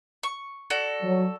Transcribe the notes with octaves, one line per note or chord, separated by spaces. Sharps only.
C#6
F#4 A4 D5
F#3